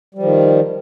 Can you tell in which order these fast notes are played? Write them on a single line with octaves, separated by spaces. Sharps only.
G3 F3 D#3